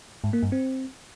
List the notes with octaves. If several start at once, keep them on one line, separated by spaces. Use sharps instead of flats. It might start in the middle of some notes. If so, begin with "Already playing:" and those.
G#2
A#3
G2
C4